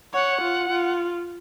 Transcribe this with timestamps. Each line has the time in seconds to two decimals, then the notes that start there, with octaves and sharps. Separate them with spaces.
0.14 C#5 F#5
0.42 F4
0.69 F4